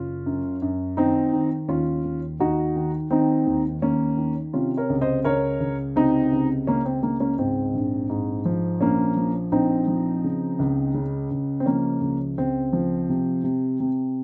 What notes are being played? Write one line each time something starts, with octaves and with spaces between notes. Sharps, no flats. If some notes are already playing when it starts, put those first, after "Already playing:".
Already playing: F#1 C#4 F4
F#2
F#2
D#3 C4 D#4
D#3
D#2 C#4 F4
D#2
D#2 D#4 F#4
D#3
D#3 C4 D#4
D#2
D#2 A#3 C#4
D#3
C3 C#4 F4
A#4 C#5
C#2
C5 D#5
C#2 A#4 C#5
C#2
C3 C4 D#4
C#2
C#2 A#3 C#4
C4
C#2 A#3
A#3 C#4
G#2 C4
A#1
G#2
F3
A#1 A#3 C#4
F3
A#1 C4 D#4
F3
C#3
C#2
C#3
C#2
C4
F3 A#3 C#4
C#2
C#2 C4
F3
C3
C3
C3